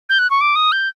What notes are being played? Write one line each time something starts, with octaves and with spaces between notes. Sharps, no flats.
G6
F#6
C#6
D6
D#6
G6